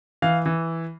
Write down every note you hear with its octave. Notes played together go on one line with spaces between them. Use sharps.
E3 F5
E3